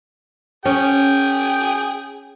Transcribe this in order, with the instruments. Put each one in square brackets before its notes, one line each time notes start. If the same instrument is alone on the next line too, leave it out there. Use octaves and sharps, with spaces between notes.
[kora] C#4 [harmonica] G#4 G5